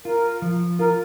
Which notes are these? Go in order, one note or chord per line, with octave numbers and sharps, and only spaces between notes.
F4 A#4
F3
F4 A#4